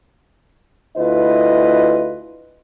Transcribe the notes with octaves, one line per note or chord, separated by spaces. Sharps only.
D2 E4 F4 B4 D#5